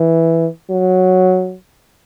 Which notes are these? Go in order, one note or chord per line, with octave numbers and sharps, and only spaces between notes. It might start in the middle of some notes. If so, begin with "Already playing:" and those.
Already playing: E3
F#3